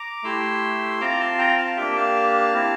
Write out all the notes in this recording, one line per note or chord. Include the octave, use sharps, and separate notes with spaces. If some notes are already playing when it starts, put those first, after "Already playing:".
Already playing: A#5 D6
A3 E4 G4 C6 E6
C4 F4 A#5 D6
A5 C6
G5 A#5
F5 A5
A#3 D4 G4 E5 G5
F5 A5
C4 E4 G4